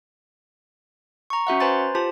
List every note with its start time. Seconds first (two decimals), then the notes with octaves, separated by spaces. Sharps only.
1.30 A#5 C#6
1.47 C#4 F#4 E5 F#5
1.60 B4 C5 G#5 A#5 C6 A6
1.95 F4 G4 C5 A5